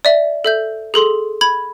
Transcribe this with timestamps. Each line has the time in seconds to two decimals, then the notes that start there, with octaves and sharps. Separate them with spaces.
0.05 D5 E5
0.45 A4 E5 G6
0.94 G#4 A4 C6
1.41 B5 G#6 F#7